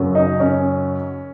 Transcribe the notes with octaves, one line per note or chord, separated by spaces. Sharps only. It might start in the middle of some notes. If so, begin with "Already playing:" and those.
Already playing: F#2 C#3 F#3
D#4
C#4